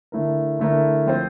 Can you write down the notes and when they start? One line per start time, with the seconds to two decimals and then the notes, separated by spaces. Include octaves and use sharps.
0.12 D3 A3 E4 A#4
0.59 D3 A3 E4 A#4
1.06 F3 C4 F4 C5